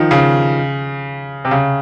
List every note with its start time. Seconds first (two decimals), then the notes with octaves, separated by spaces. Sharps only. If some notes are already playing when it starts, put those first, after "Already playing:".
Already playing: D#3 F3
0.11 C#3
1.45 C3
1.51 C#3